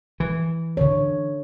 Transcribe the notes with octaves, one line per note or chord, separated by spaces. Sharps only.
E3
D3 C#5